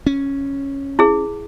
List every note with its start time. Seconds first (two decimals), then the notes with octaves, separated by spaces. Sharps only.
0.06 C#4
0.99 E4 G#4